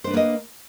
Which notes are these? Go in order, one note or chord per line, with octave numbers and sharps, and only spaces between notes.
A#3 D4 B4 C5 D#5